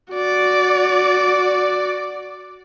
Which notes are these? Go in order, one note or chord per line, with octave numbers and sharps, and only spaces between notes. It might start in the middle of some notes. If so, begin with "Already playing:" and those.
F#4 D5